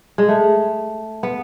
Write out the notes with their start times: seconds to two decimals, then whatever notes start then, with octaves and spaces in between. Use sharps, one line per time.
0.18 G#3
0.29 A3
1.23 B3